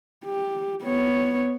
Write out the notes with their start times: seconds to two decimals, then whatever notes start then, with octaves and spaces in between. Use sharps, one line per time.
0.25 G4
0.84 B3 C#5